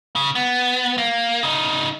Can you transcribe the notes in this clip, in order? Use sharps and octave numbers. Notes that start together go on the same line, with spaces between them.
C#3
B3
A#3
C#3 D#4